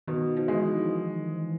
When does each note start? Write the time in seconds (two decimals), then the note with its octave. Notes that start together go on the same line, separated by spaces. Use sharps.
0.07 B2 D#3
0.37 F3
0.48 E3 G#3